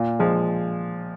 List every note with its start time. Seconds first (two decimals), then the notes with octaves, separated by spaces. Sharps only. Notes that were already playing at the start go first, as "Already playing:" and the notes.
Already playing: A#2 F4
0.19 F3 G#3